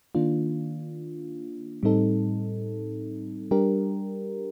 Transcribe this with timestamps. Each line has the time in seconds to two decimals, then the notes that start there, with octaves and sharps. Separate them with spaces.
0.15 D#3 A#3 D4 F4
1.83 A2 G3 C4 D#4 A4
3.51 G3 D4 G4 A#4